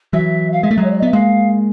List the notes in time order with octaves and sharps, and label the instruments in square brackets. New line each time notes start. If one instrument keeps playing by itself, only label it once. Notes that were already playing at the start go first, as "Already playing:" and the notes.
[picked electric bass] E3 F#3 [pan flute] E5
[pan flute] F5
[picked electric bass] G#3 [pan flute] E5
[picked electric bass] A3
F#3 G#3
[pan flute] C#5
D5
D#5
[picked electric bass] B3 [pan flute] E5
[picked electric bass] G#3 A#3 [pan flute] F5